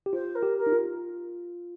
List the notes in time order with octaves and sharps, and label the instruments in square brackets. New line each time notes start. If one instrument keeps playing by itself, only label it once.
[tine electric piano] G4
[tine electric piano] F4 [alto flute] C5
[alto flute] A#4
[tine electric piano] G4
[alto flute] A#4
[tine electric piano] D#4
F4